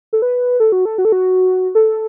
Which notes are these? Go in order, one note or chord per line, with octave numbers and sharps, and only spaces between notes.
A4
B4
A4
F#4
A4
F#4
A4
F#4
A4